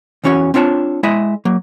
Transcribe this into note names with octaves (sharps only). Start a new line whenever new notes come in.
E2 E3 C#4 F#4 C#5
C4 D4 F4 C#5 A5
G#3 E4 D#5 E5
F#3 A#3